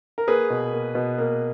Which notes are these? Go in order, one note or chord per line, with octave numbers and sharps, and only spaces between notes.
A#4
A#3 G#4 B4
B2
A#3
B2
A#3